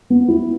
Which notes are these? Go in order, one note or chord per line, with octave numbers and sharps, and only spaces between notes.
B3
E4